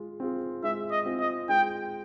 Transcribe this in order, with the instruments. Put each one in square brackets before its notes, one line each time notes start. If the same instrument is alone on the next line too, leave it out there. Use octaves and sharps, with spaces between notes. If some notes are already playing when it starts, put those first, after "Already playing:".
Already playing: [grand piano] G#3 F4
C4 F4 G#4
[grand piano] G#3 [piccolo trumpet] E5
[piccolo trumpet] D#5
[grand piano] C4 F4 G#4
[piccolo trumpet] D#5
[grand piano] G#3 [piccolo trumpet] G5